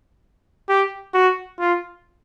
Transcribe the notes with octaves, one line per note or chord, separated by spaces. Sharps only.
G4
F#4
F4